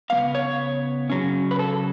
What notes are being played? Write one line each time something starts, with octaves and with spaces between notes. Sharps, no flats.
C#3 G#3 B3 F5
C#5
C#3 F#3 C#4
B4
A4